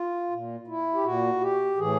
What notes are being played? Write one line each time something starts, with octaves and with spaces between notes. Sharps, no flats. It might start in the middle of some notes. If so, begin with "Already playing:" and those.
Already playing: F4
A#2
E4
G4
A#2 F#4
G4
A2 E3 G#4